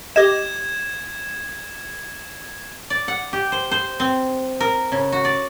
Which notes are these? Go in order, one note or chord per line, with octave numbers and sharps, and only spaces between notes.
G4 D#5 G#6 E7
D5
F#5
G4
C5
C5
C4
A#4
C#3
F#4
D5